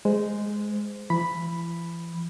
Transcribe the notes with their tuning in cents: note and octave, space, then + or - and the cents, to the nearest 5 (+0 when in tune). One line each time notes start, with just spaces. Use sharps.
G#3 +0 C5 -20
E3 +45 B5 +0